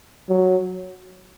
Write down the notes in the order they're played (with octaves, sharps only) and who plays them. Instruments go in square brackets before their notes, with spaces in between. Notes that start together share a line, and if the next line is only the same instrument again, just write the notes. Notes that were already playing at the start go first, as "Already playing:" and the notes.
[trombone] F#3